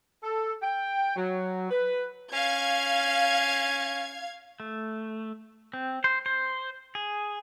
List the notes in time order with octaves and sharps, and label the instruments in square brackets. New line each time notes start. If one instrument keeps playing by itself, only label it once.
[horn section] A4
G5
F#3
B4
[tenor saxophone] C#4 [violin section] F5 G#6
[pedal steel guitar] A3
C4
C5
C5
G#4